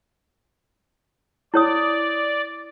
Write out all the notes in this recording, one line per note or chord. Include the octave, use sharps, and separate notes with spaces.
E4 C#5 D5 D#6